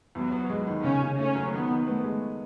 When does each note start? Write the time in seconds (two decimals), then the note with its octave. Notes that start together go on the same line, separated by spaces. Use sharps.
0.15 E2 F#3
0.32 B3
0.50 G#3
0.67 D#3
0.84 C#3 C#4
1.02 C#3
1.19 A3 C#4
1.35 F#3
1.53 D#3 B3
1.70 D#3
1.87 A3 B3
2.04 G#3